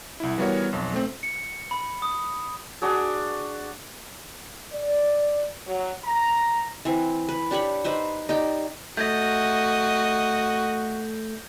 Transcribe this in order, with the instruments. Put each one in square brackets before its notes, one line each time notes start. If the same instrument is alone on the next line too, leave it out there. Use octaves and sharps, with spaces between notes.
[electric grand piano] C2 E4
E3 G3 B3 F#4 A#4 C#5
B1 F2
A3 C4
[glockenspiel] C#7
B5
D#6
[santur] D4 F#4 G#4
[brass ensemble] D5
F#3
A#5
[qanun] E3 C4
B4
D4 G4 C#5 B5
D#4 B4 C5 E5
D#4 G4 D5 G5
[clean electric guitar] A3 [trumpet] F#4 [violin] D#5 [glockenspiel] G6 G#6 A#6